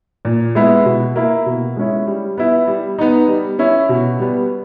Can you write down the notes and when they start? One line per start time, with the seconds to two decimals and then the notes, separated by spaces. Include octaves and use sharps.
0.25 A#2
0.55 G#3 B3 E4
0.85 B2
1.16 A#3 E4
1.46 B2
1.76 G#3 C#4 E4
2.07 G3
2.37 B3 E4
2.67 G3
2.99 B3 D#4
3.28 G3
3.59 C#4 E4
3.89 B2
4.19 G3 B3